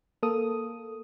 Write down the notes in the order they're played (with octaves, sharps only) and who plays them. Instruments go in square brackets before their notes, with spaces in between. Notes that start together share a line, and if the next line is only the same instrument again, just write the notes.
[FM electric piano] A#3 A4 D#6